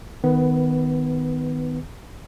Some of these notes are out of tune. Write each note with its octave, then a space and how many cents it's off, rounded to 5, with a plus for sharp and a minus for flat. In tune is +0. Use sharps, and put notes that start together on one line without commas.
D#3 +0 B3 +20 B4 +0